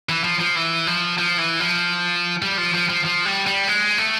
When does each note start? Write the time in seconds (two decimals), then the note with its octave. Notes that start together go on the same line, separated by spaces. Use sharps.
0.09 E3
0.24 F3
0.40 F3
0.56 E3
0.87 F3
1.18 F3
1.38 E3
1.60 F3
2.42 G3
2.58 F3
2.74 F3
2.89 F3
3.05 F3
3.25 G3
3.47 G3
3.68 G#3
3.98 A3